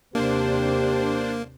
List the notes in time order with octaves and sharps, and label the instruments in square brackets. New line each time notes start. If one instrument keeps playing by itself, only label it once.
[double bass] D#2 C3 [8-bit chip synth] A#3 [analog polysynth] D4 C5 [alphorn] G4